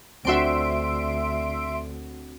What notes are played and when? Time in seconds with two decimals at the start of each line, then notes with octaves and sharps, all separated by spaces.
0.25 D2 C4 D4 F#4 E5 C6 D7